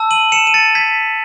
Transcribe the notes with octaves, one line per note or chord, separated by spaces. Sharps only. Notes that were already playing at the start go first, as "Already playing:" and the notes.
Already playing: A5 E6
D#7 F#7
C#7 E7
D#7
A6 C#7
G#6 B6